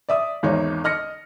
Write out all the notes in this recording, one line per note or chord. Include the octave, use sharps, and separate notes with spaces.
D5 E5 D#6
G#1 E2 D#4 C#5
D#5 F6 A#6 C#7